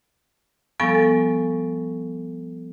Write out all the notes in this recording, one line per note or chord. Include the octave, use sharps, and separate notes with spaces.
F3 G3 B3 A4 G#5 C#6